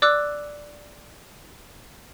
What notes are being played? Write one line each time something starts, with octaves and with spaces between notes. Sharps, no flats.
D5 D6 E6 F#6